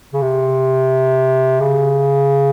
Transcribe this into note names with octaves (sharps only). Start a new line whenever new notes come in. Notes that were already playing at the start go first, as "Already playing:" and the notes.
C#3
C3
C#3